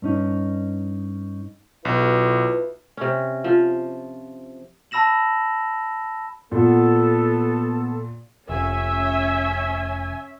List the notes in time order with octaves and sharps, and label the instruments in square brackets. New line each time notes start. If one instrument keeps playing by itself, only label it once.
[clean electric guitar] G2 C#4 D#4
[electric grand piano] B1 [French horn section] E4 F4 B4
[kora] C3 C#4
F3
[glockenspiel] A5 B5 E6 A#6 E7 F#7
[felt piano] A#2 [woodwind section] B3 A4
[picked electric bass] F1 [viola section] C#4 E5 [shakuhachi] G#5